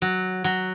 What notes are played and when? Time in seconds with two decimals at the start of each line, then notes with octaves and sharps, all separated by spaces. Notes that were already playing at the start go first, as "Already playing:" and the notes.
0.02 F#3
0.44 F#3